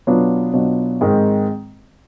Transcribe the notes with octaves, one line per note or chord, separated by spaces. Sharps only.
B2 F#3 B3 D4 F4
B2 F#3 B3 D4 F4
G#2 D#3 G#3 C4